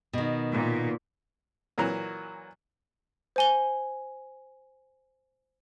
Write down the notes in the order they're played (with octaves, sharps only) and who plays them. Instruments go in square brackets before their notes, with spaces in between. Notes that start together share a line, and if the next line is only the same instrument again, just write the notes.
[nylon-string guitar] B2 D#3
[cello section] A#2
[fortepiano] A#2 E3 F#3 A#5
[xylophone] C5 G#5 G7